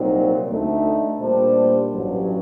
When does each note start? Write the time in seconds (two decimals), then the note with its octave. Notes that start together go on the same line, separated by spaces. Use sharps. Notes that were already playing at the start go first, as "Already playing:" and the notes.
Already playing: C2 A#2 F#3 C4 D#4
0.49 D2 D3 A3 D#4
1.20 A#2 G3 D4 G4 C5
1.92 A1 G2 F#3